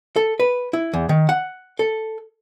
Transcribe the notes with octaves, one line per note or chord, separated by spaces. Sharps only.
A4
B4
E4
E2
D#3
F#5
A4